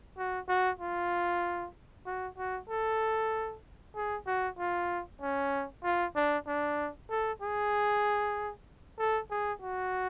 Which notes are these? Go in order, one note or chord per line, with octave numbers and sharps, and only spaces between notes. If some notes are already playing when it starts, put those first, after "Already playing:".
F#4
F#4
F4
F#4
F#4
A4
G#4
F#4
F4
C#4
F4
D4
D4
A4
G#4
A4
G#4
F#4